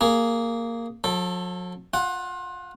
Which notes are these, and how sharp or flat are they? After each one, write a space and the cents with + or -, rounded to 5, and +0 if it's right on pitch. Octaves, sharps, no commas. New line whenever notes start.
A#3 -10 G#4 +0
F#3 -45 A4 +0
F4 +25 F#5 +0